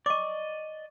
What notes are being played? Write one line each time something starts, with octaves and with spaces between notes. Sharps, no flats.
D5 D#5 C#6 D6